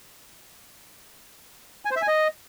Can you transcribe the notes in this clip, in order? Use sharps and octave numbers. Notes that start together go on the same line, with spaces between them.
G#5
C5
E5
G#5
D#5